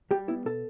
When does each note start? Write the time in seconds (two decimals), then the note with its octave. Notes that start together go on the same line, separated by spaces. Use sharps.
0.11 G3 G4
0.28 B3 E4
0.46 B2 A4